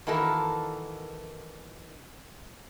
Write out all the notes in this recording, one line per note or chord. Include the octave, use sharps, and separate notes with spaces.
D#3 E3 A#3 F#4 A4 A#4